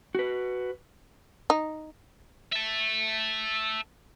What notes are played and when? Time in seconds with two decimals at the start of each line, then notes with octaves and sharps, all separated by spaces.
0.15 F#4 B4
1.50 D#4
2.53 E5 A5